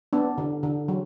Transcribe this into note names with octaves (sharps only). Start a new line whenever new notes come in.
B3 D4
D3
D3
F#3